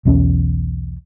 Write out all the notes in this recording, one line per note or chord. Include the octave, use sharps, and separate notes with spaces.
B1 E2 C4 C#4